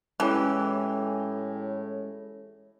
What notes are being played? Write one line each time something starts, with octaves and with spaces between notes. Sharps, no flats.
A2 E3 G#3 C#4 G4